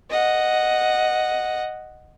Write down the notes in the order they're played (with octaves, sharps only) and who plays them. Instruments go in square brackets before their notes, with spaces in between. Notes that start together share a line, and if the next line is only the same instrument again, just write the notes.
[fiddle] D#5 F#5